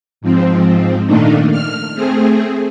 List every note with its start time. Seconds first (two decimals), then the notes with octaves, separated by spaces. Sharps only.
0.21 G#2 F3 C4
1.06 A#2 D#3 A3 A#3 D4 D#4
1.51 F6
1.94 A3 C4 G#4